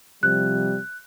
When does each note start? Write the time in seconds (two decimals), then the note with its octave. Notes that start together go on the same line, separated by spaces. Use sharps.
0.23 C3 F3 G3 F#6